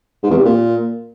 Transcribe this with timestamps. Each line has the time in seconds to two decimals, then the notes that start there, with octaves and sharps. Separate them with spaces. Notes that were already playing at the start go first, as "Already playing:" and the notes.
0.23 G#2
0.30 E2
0.37 C3
0.44 A#2